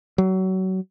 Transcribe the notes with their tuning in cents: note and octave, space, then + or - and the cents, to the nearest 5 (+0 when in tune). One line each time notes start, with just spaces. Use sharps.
F#3 +25